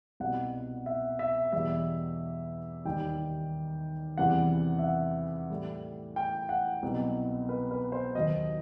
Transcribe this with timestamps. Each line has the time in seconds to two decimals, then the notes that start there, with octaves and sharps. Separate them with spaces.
0.20 C2 B2 G3 F#5
0.86 E5
1.19 E5
1.52 E2 B2 G3 E5
2.85 D#2 D#3 G3 G5
4.18 E2 C3 E3 G3 F#5
4.79 E5
4.84 F#5
5.50 A2 G3
6.16 G5
6.49 F#5
6.83 C2 B2 F#3
7.49 B4
7.71 B4
7.92 C5
8.15 D#2 D#3 F#3 D#5